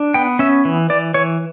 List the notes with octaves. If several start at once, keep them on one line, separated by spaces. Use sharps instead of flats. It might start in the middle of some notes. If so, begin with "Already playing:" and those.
Already playing: D4
B3 G5
C#4 E5
E3
E3 D5
E3 C#5